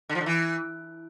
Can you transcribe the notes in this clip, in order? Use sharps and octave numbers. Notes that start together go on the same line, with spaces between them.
D3
F3
D3
E3